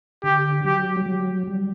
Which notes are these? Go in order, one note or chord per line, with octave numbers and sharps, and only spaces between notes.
D3 G4
F#3 G4
G3
F#3
G3